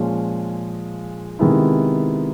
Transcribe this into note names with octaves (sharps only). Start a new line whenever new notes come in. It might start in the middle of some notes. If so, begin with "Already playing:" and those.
Already playing: A#2 F3 G#3 C#4
C3 D#3 G#3 B3 E4